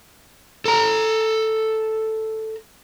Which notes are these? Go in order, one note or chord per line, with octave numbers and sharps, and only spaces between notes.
A4 A#5